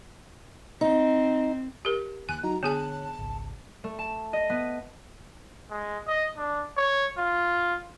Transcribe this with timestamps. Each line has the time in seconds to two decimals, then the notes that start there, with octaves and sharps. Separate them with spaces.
0.81 C4 D#4
1.85 G4 A#4
2.29 D#2 G#5 F#6
2.43 F#3 D#4 F#4 A#5
2.63 D3 B3 G#4 C#5 G#5 A5 F#6
3.19 G#1 C#2
3.84 A3
3.99 A5
4.33 D#5
4.50 B3
5.70 G#3
6.08 D#5
6.37 D4
6.77 C#5
7.18 F4